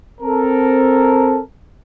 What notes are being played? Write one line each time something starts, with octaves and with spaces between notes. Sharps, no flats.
C4 A4 A#4